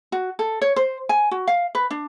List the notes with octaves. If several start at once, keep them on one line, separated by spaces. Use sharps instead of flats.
F#4
A4
C#5
C5
G#5
F#4
F5
B4
D4